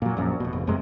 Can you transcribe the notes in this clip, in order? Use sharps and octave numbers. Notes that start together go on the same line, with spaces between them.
A#2 F#3
A#1 F#2
F1 B2
F1
E1 F#2 C3 G#3